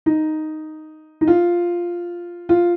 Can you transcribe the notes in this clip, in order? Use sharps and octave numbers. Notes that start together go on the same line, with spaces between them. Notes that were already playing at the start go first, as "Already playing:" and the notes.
D#4
D#4
F4
F4